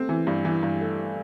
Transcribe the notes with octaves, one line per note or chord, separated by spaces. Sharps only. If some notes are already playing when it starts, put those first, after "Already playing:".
Already playing: A3 C4
E3
G2
E3
G2
A3